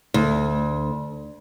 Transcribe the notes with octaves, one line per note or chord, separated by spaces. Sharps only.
D2